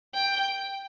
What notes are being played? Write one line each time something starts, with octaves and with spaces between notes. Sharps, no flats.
G5